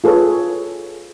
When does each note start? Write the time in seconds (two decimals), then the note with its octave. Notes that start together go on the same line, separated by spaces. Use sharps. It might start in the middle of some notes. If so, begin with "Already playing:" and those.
0.04 F4 G#4 A4 B4 C#5